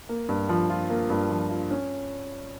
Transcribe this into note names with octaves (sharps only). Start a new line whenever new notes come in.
A#3
G2
F3
F4
A#3
G2
F3
F4
C#4